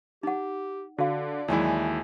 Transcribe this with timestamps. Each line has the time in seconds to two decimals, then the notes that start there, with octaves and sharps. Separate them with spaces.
0.23 D#4 G4 F#5
0.98 D3 F#4 D5 F5
1.48 D#2 E3 F#3 G#3 E4